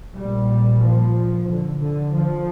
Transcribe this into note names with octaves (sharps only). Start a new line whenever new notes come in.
A#1 A#2 G3
F3
D3
D3
F3